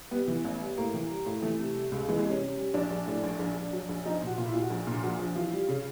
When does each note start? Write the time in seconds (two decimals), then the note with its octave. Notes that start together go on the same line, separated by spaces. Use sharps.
0.11 G3 B3
0.28 E3
0.45 A1
0.61 G3
0.77 A2 A#3
0.94 E3
1.10 G3
1.26 A2
1.42 E3 A3
1.59 C3
1.76 G3
1.92 C#2
2.09 E3 G#3
2.19 G#3
2.24 C3
2.30 C#4
2.41 G3
2.57 G3
2.74 A#1 D4
2.91 A#1
3.07 A2
3.23 A#1
3.39 A#1
3.56 A#1
3.73 F#3
3.89 A#1
4.06 F3 D#4
4.22 A#2 F#4
4.38 A#2 F4
4.46 E4
4.54 A#2 F4
4.62 F#4
4.70 A#1
4.87 A#2
5.03 A#1 F#4
5.19 F3
5.35 E3 F4
5.53 G3
5.69 C#3